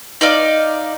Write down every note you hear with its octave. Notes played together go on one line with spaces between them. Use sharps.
D#4 D5 F5